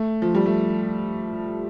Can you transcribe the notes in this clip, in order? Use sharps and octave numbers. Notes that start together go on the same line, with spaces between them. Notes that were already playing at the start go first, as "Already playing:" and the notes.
Already playing: A3
F3
G3
A3